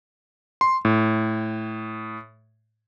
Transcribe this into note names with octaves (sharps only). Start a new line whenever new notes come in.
C6
A2